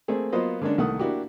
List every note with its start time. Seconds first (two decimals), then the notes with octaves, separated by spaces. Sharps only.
0.08 A3 A#3 C4 G#4
0.32 F#3 A#3 B3 F4 C5 D#5
0.61 D3 G#3 A#3 C#4 D4
0.78 C2 D#3 A3 A#3 F#5 D#6
0.99 A#3 D4 E4 F#4 G4